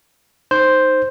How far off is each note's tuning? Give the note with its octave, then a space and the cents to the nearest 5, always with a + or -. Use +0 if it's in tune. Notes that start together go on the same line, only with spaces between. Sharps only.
D#4 +0 C5 +0